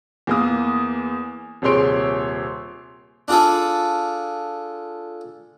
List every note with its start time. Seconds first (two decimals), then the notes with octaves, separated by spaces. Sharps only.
0.27 E2 A#3 D#6
1.62 D#1 C3 G#4 C#5 C6 D7
3.28 D4 F4 G#4 A4